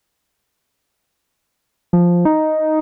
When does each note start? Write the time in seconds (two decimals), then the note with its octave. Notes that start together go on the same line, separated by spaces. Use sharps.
1.93 F3
2.25 D#4